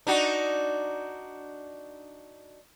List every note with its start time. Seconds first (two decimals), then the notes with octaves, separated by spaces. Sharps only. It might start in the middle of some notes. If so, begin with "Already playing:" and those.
0.07 D4 D#4 F#4